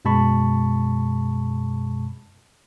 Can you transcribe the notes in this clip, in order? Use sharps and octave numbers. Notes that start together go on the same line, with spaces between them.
F#2 B2 G#3 A5 B5 C#6